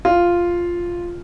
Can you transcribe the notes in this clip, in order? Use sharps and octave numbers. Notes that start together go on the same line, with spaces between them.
F4